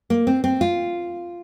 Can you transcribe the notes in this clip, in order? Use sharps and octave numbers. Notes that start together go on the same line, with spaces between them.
A#3
C4
C4
F4